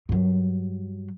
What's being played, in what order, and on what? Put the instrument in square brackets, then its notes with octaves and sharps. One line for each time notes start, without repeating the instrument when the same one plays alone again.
[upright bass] G2 F#3